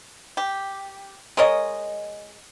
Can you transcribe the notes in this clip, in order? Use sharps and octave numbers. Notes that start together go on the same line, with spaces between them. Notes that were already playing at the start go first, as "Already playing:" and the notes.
G4
G#3 A#4 C#5 D#5